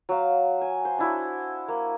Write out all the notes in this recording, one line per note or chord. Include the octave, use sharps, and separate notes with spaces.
F#3 F5
G#5
C5
D4 E4 F#4
A#3